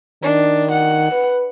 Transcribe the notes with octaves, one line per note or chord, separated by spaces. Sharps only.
D#3 D4
F#5
B4